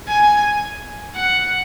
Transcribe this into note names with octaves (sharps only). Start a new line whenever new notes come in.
G#5
F#5